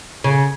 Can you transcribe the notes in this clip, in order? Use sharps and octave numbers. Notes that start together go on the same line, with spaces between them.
C#3